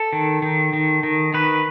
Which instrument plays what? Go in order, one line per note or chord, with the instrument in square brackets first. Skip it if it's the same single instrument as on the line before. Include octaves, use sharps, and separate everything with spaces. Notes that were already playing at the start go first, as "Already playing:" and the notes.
Already playing: [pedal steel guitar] A4
D#3
D#3
D#3
D#3
D#3 B4